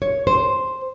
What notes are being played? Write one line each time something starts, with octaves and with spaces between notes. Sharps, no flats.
C#5
C5